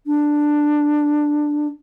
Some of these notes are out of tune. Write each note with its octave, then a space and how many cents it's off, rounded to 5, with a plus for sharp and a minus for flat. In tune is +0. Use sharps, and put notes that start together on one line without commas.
D4 +10